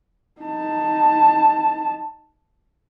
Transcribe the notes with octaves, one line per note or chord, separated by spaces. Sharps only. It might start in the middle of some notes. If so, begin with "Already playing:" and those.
D#4 A5